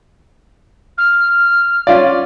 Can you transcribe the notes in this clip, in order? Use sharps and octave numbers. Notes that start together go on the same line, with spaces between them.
F6
C#4 F4 D5